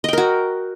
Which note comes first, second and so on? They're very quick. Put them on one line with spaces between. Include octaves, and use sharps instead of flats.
D#5 G5 A#4 F#4